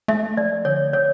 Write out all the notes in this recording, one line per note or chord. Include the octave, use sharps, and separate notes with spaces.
A3 E5
F3 D5
D3 C#5
C#5